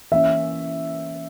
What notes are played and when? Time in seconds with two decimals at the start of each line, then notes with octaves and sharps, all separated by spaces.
0.12 E3 A#3 C#4 E5